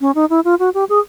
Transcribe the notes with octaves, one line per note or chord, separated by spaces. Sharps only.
C#4
D#4
E4
F4
F#4
G4
G#4